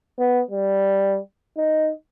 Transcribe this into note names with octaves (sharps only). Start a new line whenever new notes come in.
B3
G3
D#4